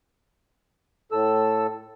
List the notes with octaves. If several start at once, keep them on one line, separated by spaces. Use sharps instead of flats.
A2 A4 E6